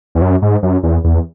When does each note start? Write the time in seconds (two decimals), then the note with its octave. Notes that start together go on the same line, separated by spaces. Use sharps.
0.15 E2
0.22 F#2
0.42 G#2
0.63 F#2
0.83 E2
1.04 E2